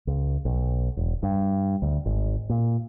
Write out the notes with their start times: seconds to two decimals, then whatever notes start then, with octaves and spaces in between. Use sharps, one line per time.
0.07 C#2
0.45 B1
0.97 E1
1.23 G2
1.82 D2
2.06 G#1
2.50 A#2